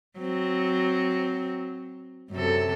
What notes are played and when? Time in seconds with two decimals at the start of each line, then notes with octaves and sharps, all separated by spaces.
0.19 F#3 C4
2.31 F#2 C3 A4